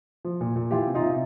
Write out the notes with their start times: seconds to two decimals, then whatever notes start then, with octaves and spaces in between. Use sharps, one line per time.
0.25 F3
0.41 A#2
0.56 A#2
0.71 E3 F4 G4
0.87 C3
0.94 D#4 F4
1.02 C3